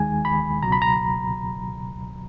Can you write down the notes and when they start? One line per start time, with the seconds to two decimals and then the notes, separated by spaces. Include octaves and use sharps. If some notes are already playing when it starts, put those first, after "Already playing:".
Already playing: D#2 D#3 G#3 G#5
0.25 B5
0.63 C#2 B2 F#3 A#5
0.72 B5
0.82 A#5